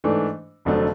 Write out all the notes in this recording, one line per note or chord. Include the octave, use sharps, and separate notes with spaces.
G#2 E3 A3 D4
F1 F2 D3 F#3 A3